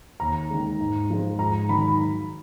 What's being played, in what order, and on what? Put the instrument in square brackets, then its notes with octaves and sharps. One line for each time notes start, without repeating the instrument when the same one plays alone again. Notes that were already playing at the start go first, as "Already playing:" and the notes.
[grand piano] D#2 A#5
D#3 G#3
G#2
F3 G#3
G#2 A#5
D#3 F#3 B5
B5